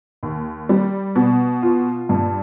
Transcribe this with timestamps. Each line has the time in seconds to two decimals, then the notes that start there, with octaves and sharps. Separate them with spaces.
0.23 D#2
0.69 G3
1.15 B2
1.62 F4
2.09 G2